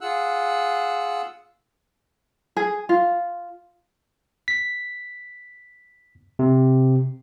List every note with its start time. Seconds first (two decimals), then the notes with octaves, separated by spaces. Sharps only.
0.01 F4 G#4 F#5 E6 F#6
2.57 G#4
2.89 F4
4.48 B6
6.39 C3